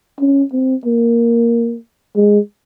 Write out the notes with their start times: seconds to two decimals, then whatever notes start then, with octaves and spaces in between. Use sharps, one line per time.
0.20 C#4
0.52 C4
0.85 A#3
2.16 G#3